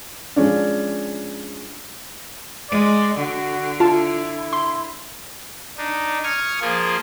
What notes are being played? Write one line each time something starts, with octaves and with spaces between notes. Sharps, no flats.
F3 G#3 C#4 D4
G#3 D5
D3 F#4
E4 F4 A5
C6
D4 D#4
C#6 D#6 F6 G#6
F3 A#3 F4 G#4